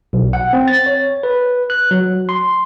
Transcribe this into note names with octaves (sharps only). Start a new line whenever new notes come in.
B1
F#5
C4
A6
C#5
B4
F#6
F#3
C6